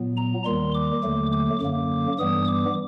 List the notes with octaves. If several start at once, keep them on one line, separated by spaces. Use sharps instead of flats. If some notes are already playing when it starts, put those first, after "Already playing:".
Already playing: A#2 F#3 B3
A#5
D#2 D#3 G3 C6
D6
D#2 D3 F#3 A3
D6
F#2 D3 F#3 A#3 D6
G2 E3 G3 B3 D#6
D6